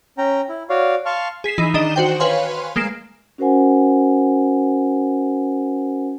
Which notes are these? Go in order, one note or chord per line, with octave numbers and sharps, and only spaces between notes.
C#4 G5 A#5
E4
F#4 C#5 D5 F5
F5 A5 C6 C#6 F6
G#4 B6 C7 E7
E3 D#4
D#3 D4 D#5 E7 G7
F#4 C5 G5
B4 C#5 F5 G#5 C6
G#3 A#3 C7 D7 E7
C#4 F#4 A#4 C5 F#5 G#5